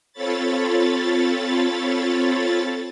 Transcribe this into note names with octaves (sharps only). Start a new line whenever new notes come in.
C4 F4 A4 C#5 B5 A6